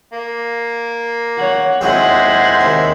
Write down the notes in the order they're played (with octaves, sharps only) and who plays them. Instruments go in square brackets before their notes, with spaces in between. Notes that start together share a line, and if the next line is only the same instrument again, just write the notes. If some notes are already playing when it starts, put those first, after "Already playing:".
[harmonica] A#3
[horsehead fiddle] C#5 F#5
[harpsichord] D#2 C4 F#4 [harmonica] G#3 E4 [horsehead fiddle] C5 F#5
[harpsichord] D#2 C3